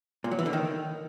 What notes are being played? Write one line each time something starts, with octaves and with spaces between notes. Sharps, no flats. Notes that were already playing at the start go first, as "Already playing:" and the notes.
A#2
F#3
E3
D3
D#3